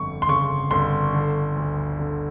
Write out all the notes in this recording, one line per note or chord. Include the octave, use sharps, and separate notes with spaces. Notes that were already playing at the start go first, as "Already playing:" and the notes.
Already playing: G1 F2 C#6
C6
C#3 C#6
G1 C6
D3
D2
D3